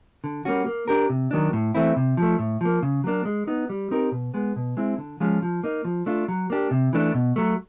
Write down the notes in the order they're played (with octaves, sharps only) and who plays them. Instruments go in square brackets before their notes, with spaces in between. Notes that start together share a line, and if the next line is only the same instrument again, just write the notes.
[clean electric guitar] D3
G3 A#3 C#4 F#4
A#3
D4 G4 A#4
C3
D#3 F#3 A#3 D4
A2
E3 A3 C4 E4
C3
F3 A3
A2
F3 A#3
C#3
F#3 A#3 D4
G#3
B3 D#4
G3
C4 D#4 G4 A#4
B2
G#3 B3
B2
G#3 C4 E4
D3
F3 G#3 C#4 F4
F3
A#3 D#4
F3
A3 D4 F4
F#3
A#3 D4 G4
C3
E3 A3 D4
B2
F#3 A3